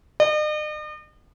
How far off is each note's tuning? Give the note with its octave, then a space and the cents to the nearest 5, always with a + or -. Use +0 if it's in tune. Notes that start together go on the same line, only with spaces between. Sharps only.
D#5 -45